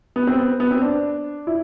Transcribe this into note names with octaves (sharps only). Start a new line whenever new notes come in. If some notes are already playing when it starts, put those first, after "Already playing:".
B3
C4
B3
B3
C4
D4
E4